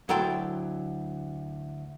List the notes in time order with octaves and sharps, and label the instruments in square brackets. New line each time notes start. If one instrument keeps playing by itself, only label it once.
[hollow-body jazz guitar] D2 F#3 E4 A4 G5 C6